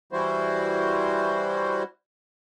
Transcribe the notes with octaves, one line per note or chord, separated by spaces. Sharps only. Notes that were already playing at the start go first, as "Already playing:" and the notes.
E3 G3 E4 F#4 C5